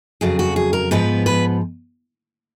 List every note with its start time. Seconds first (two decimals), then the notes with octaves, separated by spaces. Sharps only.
0.21 F2 C#3 F#3 G#4
0.39 F#4
0.56 G#4
0.73 A#4
0.91 G#2 F3 B3 B4
1.26 B4